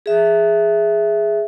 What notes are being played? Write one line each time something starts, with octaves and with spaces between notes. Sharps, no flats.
G#4 E5